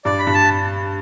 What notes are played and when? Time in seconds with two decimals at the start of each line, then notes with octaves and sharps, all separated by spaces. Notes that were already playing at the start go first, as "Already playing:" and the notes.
0.05 G2 D5
0.19 B5
0.27 G2
0.34 A5